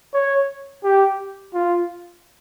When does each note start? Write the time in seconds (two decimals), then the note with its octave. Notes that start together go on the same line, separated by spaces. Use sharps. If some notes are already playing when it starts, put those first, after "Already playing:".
0.13 C#5
0.83 G4
1.54 F4